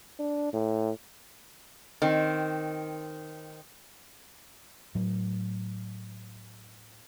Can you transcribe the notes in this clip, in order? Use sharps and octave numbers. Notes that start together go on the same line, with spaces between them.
D4
A2
D#3 C4
A2 F#3